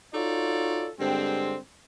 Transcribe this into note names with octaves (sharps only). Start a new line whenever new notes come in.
D#4 F4 F#4 A4 C#5 D5
G2 D3 G#3 C4